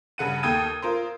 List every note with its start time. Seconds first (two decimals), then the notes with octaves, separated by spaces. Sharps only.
0.18 G2 C#3 F#5 D#7
0.43 D#2 A4 G5 D#6 G#6 D#7
0.82 F4 A#4 C5